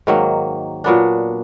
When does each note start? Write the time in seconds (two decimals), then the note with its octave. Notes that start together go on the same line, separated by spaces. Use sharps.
0.07 G#2 D#3 F#3 A#3
0.84 A#2 F#3 B3 D4